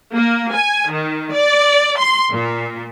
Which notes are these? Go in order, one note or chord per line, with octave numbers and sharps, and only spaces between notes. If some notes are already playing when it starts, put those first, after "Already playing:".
A#3
G#5
D#3
D5
C6
A#2